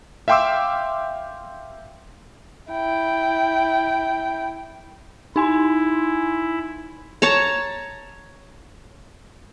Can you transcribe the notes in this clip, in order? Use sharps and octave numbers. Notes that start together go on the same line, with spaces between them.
E5 F5 G5 C6 D6 E6
E4 G5
D#4 E4 G#5 C6
C#5 A5 A#5